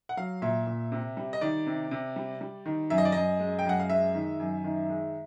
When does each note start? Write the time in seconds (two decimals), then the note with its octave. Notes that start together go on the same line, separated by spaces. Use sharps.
0.09 F#5
0.17 F#3 F5
0.42 A#2 E5
0.67 A#2
0.92 C3
1.17 G3
1.33 D#5
1.41 D#3 D5
1.67 C3
1.91 C3
2.16 G3
2.41 G3
2.66 D#3
2.90 F#2 E5
2.98 D#5
3.05 D5
3.12 F#2 D#5
3.40 G#3
3.59 G5
3.65 F#2 F#5
3.79 F5
3.90 G#3 E5
4.15 D#3
4.40 F#2
4.64 D#3
4.89 G#3